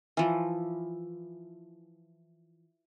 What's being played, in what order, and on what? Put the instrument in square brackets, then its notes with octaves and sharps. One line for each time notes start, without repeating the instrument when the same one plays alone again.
[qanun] E3 F3